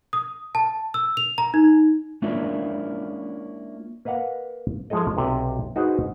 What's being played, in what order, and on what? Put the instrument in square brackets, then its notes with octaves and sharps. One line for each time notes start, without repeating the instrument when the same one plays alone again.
[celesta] D#6
A5
E6
F7
A#5
D#4
[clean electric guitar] G#3 A#3 C#4 D4 E4 F4
[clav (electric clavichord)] A#3 B4 D#5 F5 F#5 A#5
F3 G#3 E4 A4 D#5
B1 C3 G5
D#4 F#4 G#4 B4 C5